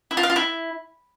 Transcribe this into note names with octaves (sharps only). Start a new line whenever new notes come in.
E4
F4
F5
F4
E4